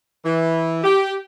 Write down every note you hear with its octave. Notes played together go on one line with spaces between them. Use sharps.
E3
G4